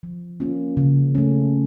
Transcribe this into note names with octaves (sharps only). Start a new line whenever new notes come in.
F3
A#3 C#4 F4
C#3
A3 C#4